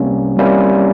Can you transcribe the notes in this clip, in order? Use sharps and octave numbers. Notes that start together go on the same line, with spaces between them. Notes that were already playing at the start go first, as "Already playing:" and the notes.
Already playing: C2 C3 G3 A#3 C#4
C2 C3 G3 A#3 C#4